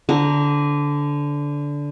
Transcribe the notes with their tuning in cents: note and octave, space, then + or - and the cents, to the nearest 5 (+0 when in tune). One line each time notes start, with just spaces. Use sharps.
D3 -15 C5 +5 A#5 +0